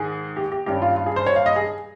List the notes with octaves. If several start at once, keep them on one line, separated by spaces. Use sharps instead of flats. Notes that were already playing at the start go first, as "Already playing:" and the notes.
Already playing: G#2 D#3 G#4
G4
G4
G#1 G2 G3 C#4 G4
F4
F4
G#4
C5
C#5
F5
D#5
G#4